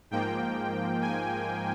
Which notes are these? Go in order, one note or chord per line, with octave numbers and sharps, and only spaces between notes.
G#2 F3 A#3 G5
G#5